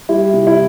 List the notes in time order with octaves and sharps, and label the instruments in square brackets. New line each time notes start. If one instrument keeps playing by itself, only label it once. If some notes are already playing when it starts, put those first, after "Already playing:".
[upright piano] G3 E4
C3
E4